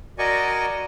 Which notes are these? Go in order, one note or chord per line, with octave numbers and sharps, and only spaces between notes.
F#4 A#4 D5 D#5 G#5 C#6